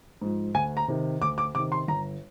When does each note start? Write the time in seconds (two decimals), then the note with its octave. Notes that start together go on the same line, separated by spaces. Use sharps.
0.21 G#2 F3
0.54 D2 G#5
0.77 A#5
0.88 C3 D#3
1.21 D2 D6
1.38 D6
1.55 C3 D#3 D6
1.72 C6
1.88 G1 A#5